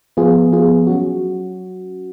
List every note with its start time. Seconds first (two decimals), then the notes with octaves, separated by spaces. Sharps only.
0.17 F3 B3 F4 G#4
0.52 F3 B3 F4 G#4
0.87 F#3 C#4 F#4